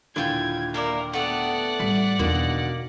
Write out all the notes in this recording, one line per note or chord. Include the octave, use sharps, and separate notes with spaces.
D#2 A#2 D3 E4 F4 G5 G#6
A#3 E4 A#4 D5
A3 B3 D5 F#5
A1 G3 B6
E2 B2 D3 D#3 A#3